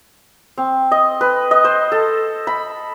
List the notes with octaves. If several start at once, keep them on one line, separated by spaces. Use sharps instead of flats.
C4
D#5
B4
D#5
C5
A4
B5